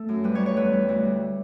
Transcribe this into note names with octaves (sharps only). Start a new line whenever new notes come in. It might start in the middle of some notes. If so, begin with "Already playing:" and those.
Already playing: A3 A4
F#2
G3 B4
G3 C#5
C#5
E2 B4
G3
D2
G3